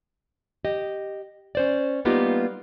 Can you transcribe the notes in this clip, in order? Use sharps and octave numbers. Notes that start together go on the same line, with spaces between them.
G4 D#5
C#4 C5 D5
G3 A#3 B3 D#4 F4 G4